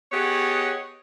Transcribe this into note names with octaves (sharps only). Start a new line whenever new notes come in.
B3 G4 G#4 C#5 D#5 F#5